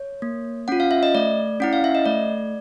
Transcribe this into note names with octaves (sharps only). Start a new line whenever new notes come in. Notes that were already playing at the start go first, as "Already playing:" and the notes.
Already playing: C#5
A#3
C#4 F4 F#5
F5
E5
D#5
A3 D5
C#4 E4 F#5
F5
E5
D#5
A3 D5